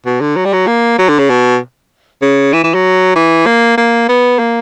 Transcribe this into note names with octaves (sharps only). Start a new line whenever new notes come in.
B2
D3
F#3
G3
F#3
A#3
F#3
D3
C#3
B2
C#3
E3
E3
F#3
E3
A#3
A#3
B3
A#3